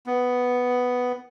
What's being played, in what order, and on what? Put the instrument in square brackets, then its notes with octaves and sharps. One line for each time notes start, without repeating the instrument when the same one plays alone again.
[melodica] B3